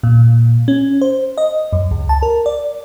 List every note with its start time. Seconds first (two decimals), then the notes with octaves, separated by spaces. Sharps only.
0.03 A#2
0.68 C#4
1.01 C5
1.38 D#5
1.73 F#2
1.91 C#2
2.09 A5
2.23 A#4
2.46 D5